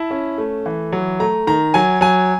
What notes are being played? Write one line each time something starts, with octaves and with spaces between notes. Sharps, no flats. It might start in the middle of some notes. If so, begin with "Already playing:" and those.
Already playing: E4 A5
C#4
A3
E3
F#3
A3 A#5
D#3 A#5
F#3 G#5
F#3 G#5